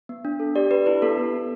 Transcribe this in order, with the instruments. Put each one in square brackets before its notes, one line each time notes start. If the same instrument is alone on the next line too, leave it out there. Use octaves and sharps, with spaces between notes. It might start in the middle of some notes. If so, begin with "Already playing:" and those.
[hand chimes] B3
D4
A4
G4 D5
G4 B4
E4 B4
B3 A4
B3
B3